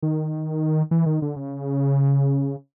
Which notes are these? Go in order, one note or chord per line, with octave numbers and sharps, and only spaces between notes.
D#3
E3
D#3
D3
C#3